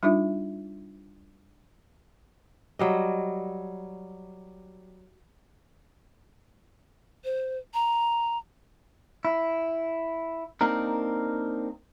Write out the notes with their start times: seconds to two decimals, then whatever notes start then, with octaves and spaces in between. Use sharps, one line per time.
0.03 G3 D4 D#4 F4 E5
2.79 F#3 G3 D#5
7.24 C5
7.74 A#5
9.25 E4
10.61 A#3 C4 D4 D#4 A#4